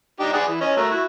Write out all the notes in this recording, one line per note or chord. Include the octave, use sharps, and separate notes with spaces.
D4 D#4 G4
G#4 D5 F#5
E3
C#4 D#5
A3 F#4 A#4
E4 F#4